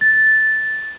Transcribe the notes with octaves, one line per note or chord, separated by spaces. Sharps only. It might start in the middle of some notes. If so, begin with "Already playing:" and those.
A6